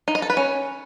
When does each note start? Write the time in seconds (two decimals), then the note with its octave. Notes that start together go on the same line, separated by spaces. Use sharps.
0.08 D#4
0.15 D#5
0.22 A4
0.30 B4
0.37 C#4